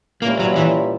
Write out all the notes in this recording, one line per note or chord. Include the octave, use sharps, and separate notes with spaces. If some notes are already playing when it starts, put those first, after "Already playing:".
A#2 G3 A#3 C#4 E4 B4
F#3
E3